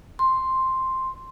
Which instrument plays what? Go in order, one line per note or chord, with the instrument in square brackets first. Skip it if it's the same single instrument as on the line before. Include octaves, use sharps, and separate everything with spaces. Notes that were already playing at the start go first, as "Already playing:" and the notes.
[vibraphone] C6